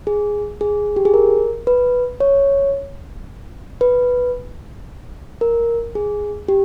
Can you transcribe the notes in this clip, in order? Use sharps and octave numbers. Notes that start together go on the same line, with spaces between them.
G#4
G#4
G4
G#4
A#4
B4
C#5
B4
A#4
G#4
G4